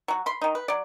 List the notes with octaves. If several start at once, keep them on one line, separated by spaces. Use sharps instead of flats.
F#3 F#4
B5 C6
D#3 D#4
B4
F#3 D5